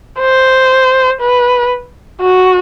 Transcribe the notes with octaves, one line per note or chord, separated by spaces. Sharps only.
C5
B4
F#4